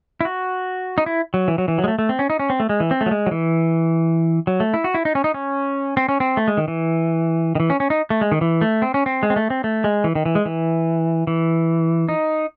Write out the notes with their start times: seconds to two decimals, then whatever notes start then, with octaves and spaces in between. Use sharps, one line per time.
0.21 E4
0.25 F#4
0.98 D#4
1.06 E4
1.34 F#3
1.48 E3
1.58 F#3
1.68 E3
1.78 F#3
1.84 G#3
1.88 A3
1.99 A3
2.09 C4
2.19 C#4
2.30 D#4
2.39 C#4
2.50 C4
2.60 A3
2.69 G#3
2.80 E3
2.91 C4
3.01 A3
3.06 F#3
3.11 G#3
3.26 F#3
3.31 E3
4.47 F#3
4.60 A3
4.74 E4
4.84 F#4
4.94 E4
5.05 D#4
5.15 C#4
5.24 D#4
5.34 C#4
5.97 C4
6.09 C#4
6.20 C4
6.37 A3
6.48 G#3
6.57 D#3
6.68 E3
7.55 D#3
7.60 E3
7.70 C#4
7.80 C#4
7.90 D#4
8.10 A3
8.21 G#3
8.32 D#3
8.41 E3
8.61 A3
8.82 C4
8.94 C#4
9.06 C4
9.23 G#3
9.30 C4
9.36 A3
9.50 C4
9.64 A3
9.84 G#3
10.04 E3
10.15 D#3
10.26 E3
10.35 G#3
10.46 E3
11.27 E3
12.09 D#4